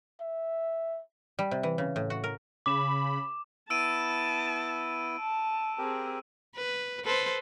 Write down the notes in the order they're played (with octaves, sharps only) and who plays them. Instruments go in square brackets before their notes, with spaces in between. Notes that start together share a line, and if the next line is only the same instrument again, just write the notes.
[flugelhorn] E5
[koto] G3
C3
E3
C#3
A2
F#4
A#4
[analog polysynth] C#3 B5 [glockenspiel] D6 E7
[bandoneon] B3 E4 [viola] A5 [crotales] E6 D7 D#7
[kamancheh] A5
[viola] C4 G#4 [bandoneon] G4 A#4
[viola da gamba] B4
A4 B4 C5